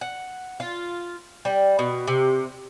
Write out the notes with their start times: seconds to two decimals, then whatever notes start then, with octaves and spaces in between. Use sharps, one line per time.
0.01 F#5
0.60 F4
1.45 G3
1.79 B2
2.08 C3